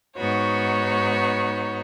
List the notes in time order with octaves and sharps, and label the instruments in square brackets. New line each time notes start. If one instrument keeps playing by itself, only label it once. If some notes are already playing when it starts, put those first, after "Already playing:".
[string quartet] G#2 B3 D#4 F#4 C#5